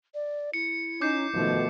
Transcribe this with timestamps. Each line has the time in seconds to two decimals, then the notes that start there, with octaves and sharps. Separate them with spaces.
0.14 D5
0.53 E4 C#7
1.01 C#4 D#4 D6 G6 C7
1.34 B2 D#3 F3 A3